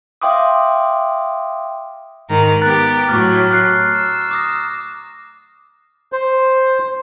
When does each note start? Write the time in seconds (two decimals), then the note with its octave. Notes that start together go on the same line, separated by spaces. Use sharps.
0.22 E5 F5 G5 C6 D6 D#6
2.29 G#2 D#3 A#5
2.62 B3 G4 A#5 F#6 A6
3.09 A2 F#3 C#6 D6 F6
3.51 F6 F#6 C7
3.94 E6
4.31 D6 D#6 A#6
6.12 C5